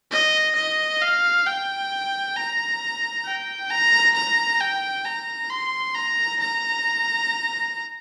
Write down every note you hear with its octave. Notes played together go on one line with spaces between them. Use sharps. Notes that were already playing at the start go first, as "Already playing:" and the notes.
D#5
D#5
F5
G5
A#5
G5
A#5
A#5
G5
A#5
C6
A#5
A#5